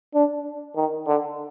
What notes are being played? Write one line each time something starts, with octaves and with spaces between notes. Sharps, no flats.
D4
D#3
D3